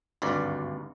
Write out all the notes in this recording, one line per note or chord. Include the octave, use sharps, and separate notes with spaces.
G#1 D2 G2 D5